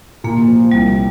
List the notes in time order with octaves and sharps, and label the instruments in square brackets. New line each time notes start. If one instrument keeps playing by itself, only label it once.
[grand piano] A#2 [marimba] A#3
[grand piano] F3
[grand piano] C2 [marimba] G3